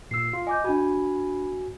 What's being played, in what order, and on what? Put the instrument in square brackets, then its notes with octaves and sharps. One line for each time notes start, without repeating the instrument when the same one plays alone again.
[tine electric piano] A#2 E6 [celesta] C7
[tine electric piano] F4
[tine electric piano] D#5 [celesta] G#5 D6 G6
[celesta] D4 B5 [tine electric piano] F#4 G#5